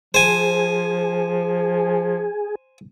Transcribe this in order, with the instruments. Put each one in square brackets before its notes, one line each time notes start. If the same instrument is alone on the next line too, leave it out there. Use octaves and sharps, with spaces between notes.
[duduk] F3 [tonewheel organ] G#4 [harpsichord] C5 G#5